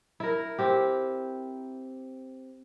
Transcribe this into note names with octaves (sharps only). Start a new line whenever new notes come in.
E4 A#4
C4 G4